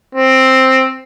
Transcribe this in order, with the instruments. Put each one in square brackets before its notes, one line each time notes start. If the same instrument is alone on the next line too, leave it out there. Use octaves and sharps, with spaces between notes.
[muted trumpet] C4